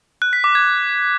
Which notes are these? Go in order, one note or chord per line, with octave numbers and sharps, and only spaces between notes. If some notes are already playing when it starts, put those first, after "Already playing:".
F#6
B6
D6
G#6